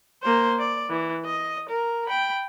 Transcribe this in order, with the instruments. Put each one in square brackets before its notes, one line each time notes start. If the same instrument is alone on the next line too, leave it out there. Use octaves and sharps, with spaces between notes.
[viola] A#3 C5
D5
E3
D#5
A#4
G5 B5